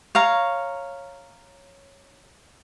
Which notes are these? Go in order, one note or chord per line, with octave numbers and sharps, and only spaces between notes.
C#5 F5 A#5